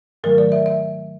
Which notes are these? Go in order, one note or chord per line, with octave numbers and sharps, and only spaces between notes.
G#2 D#3 F#3 A3 A#4
D5
E5
E5